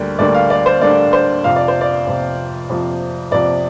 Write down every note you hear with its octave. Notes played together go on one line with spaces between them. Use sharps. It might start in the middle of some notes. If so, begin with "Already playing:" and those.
Already playing: D2 D3 G3 A#3 D4
D2 D3 G3 A#3 D4 D5
F5
D5
C5
D2 D3 G3 A#3 D4 D5
C5
F2 C3 F3 F5
D5
C5
D5
F2 C3 F3
F2 C3 F3
F2 C3 F3 D5